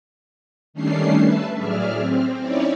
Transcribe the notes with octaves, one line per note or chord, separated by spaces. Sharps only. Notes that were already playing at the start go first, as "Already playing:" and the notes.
D#3 G3 A3 C#4 D4 C7
B4 E5 A5
A2 F#3 G#4 D5 E5 F6
C4
C#4 D#4 E4 C#5 D5